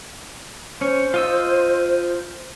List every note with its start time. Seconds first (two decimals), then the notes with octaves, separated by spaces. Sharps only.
0.81 C#4 C5 C#5
1.14 F4 D#5 E6